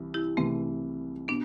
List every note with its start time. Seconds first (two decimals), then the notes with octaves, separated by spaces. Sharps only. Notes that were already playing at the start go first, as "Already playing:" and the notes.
Already playing: C2 C3 E3
0.14 E4 G4
0.37 C2 C3 E3 A3 C4
1.28 B2 B3 D4